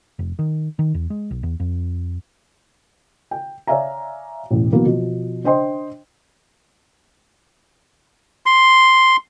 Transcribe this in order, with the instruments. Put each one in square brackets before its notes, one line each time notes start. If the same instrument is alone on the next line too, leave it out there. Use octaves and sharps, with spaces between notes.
[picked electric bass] F1
D#3
D#3
E2
G#3
B1
E2
F2
[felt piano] G5
C#5 D5 E5 F5 G#5 A#5
E1 A1
B2 E3 F#3 A#3 B3
B2 F3
D4 C5 D#5 G5 C6
[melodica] C6